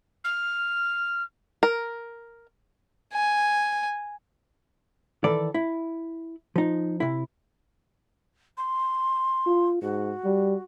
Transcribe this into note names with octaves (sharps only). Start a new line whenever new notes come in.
F6
A#4
G#5
D#3 E3 A4 D5
E4
F3 D#4
C3 E4
C6
F4
G#2 F#4
G3